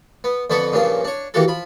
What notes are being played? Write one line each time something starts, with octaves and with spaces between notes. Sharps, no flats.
B3
F2 D3 B3 A4 B5 C#6
G2 A#2 C#3 F3 A#3 C#4
D4 C#5
D#3 E3 A#3 F#4 G4 A4
F3 B5